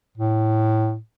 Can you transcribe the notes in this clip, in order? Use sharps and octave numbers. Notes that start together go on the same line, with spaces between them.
A2